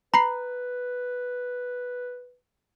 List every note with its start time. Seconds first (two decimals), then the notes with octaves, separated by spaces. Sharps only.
0.14 B4 A#5 B5 C7